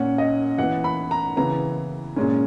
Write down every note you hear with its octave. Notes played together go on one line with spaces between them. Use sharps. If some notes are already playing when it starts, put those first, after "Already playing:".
Already playing: A#2 A#3 C#4 F#5
D#5
E3 B3 F#5
B5
A#5
C#3 E3 B3 A#5
A#2 G#3 C#4